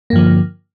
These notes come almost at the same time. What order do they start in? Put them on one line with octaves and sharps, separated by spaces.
A#3 G2 F3 D3